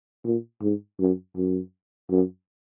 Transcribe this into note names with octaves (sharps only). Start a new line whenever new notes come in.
A#2
G#2
F#2
F#2
F#2